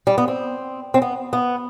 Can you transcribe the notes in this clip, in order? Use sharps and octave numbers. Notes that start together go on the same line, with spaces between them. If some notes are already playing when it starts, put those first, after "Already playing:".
G3
B3
C4
C4
B3
B3